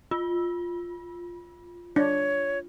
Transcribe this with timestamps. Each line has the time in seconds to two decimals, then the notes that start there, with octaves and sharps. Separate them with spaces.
0.11 F4
1.96 D4 C#5